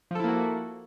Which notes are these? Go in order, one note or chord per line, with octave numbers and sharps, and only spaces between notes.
F3 A#3 E4 F#4 A4